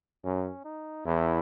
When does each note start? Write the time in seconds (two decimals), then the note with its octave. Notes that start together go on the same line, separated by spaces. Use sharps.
0.24 F#2 C#4
0.64 D#4
1.06 E2 E4